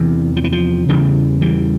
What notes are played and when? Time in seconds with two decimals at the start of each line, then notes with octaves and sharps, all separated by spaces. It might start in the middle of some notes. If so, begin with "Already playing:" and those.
Already playing: E2 C3 E3
0.36 F3
0.44 E3
0.52 F3
0.89 E2 C#3 E3 G3
1.41 E3 G3